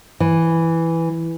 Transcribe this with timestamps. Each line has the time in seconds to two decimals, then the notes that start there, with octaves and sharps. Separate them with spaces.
0.20 E3